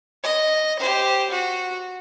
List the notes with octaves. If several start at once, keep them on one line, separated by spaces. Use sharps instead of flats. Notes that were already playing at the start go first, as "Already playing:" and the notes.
D#5
G4 C5
F#4